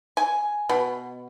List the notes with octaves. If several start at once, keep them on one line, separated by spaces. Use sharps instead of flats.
G#5
B2